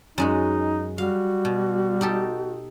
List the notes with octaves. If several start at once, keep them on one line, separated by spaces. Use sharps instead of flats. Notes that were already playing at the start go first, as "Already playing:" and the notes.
F#2 G#3 D#4 F#4
G3 F#4 F5
B2
D#4 G4 A4